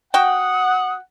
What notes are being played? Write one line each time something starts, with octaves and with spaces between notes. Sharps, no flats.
F#4 F#5 G5 D#6